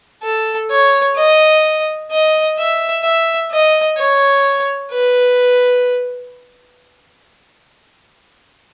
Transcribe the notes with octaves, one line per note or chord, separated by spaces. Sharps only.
A4
C#5
D#5
D#5
E5
E5
D#5
C#5
B4